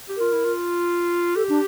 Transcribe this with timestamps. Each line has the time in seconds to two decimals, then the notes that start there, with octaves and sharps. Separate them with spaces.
0.09 G4
0.17 F4 A#4
0.33 E4
0.45 F4
1.36 G4 A4
1.49 D4